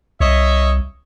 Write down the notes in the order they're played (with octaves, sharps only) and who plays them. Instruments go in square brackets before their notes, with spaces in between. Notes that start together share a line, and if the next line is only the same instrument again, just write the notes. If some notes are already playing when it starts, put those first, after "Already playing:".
[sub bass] C2 [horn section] C#5 D#5 E5